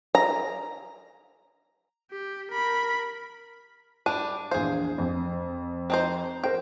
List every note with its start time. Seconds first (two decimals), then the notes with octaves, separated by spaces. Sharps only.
0.15 A#5
2.11 G4
2.52 A#4 B5
4.06 G3 D4 D#7
4.51 A#1 E2 G#4 C5 F5
4.98 F2
5.90 C4 D#4 C5
6.44 A#4 C5 G5